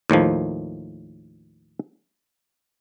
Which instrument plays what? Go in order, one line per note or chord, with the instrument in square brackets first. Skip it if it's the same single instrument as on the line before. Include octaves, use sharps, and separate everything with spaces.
[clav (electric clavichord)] D#2 A2 D#3 F3